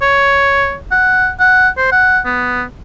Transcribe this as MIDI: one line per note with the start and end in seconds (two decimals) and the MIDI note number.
0.02 0.76 73
0.92 1.29 78
1.40 1.69 78
1.77 1.91 72
1.92 2.19 78
2.25 2.63 59